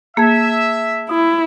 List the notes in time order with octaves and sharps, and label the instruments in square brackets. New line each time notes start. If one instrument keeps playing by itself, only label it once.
[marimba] A#3 [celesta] G#4 A5 G#6 [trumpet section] E5
[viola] E4 [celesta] D#6